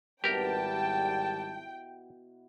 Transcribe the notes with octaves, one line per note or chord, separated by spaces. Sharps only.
G#1 B2 G3 E4 G4 A#4 G5 A5